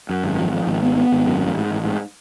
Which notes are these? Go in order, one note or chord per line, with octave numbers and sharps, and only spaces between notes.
F#2
G#1
F3
F3
G#1
B3
B3
G#1
F#2
A1
G#2
A1
G#2